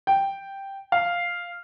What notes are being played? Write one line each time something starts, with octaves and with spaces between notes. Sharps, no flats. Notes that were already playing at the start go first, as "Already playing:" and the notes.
G5
F5